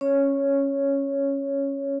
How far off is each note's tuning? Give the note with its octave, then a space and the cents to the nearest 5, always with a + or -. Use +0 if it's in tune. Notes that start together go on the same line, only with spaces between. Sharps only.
C#4 -10 C#5 +0